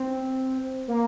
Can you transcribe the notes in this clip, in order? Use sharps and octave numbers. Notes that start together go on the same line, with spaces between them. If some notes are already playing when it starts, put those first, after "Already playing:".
Already playing: C4
A#3